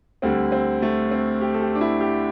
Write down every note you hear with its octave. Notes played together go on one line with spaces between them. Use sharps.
D2 D3 G3 C4
C4
A3
C4
G4
A4
G4
D4
E4
G4